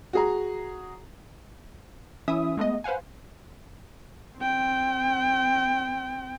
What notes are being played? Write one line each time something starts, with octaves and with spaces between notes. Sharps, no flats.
F#4 G#4 A#5
E3 C#4 E4 E5 D#6
G#3 A3 B3 D#5
B4 C5 F5 F#5 G#5
C4 G5